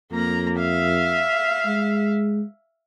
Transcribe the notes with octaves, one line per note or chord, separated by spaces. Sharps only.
F2 A#3 A#5
E5 F5
G#3